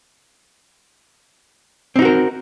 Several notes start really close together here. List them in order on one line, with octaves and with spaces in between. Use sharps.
C4 D#4 F#4 A#4